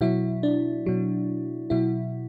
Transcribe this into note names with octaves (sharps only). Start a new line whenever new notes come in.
B2 F#3 E4
D4
B2 F#3
B2 F#3 E4